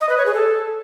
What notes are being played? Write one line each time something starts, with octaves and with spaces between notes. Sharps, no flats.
D#5
B4
C#5
G#4
A4